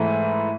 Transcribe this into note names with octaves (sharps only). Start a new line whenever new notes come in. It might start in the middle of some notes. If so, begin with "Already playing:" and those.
Already playing: G#2 E3 A3